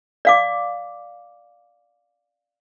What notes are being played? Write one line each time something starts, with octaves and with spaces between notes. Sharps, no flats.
D5 F5 D6